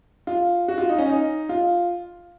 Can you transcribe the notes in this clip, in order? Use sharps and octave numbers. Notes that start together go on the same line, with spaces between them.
F4
F#4
F4
D#4
C#4
D#4
F4